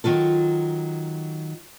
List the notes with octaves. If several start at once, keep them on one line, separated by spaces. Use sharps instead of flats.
D#3 F#3 F4 A4